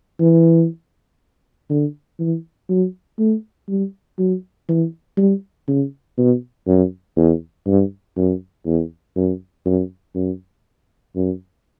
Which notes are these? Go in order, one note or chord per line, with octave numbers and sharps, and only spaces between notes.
E3
D3
E3
F#3
A3
G3
F#3
E3
G3
C#3
B2
F#2
E2
G2
F#2
E2
F#2
F#2
F#2
F#2